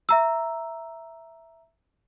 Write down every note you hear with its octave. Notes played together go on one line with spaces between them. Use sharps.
E5 A#5 E6